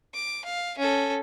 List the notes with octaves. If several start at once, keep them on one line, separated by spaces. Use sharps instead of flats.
D6
F5
C#4 A4